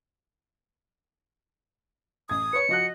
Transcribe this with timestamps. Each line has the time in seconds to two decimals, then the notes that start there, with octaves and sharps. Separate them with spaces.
2.29 A1 D#6 G#6
2.53 B4 C#5 C#7
2.69 F3 F#4 D#5 F#6